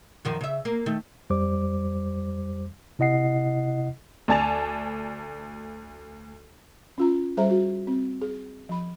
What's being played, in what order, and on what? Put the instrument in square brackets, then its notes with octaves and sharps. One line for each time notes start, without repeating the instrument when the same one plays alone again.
[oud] F#2 D#3 F3
C#3 E5
A#3
D#3 A3
[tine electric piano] F2 G3 C5 D6
C3 E4 D#5 F#5 C7
[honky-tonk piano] D2 D5 G#5 A5 A6 F7
[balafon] C#4 F4 A#5
G3 G#4 C5 E5 A#5
F#4
C4
G#4
F3 B5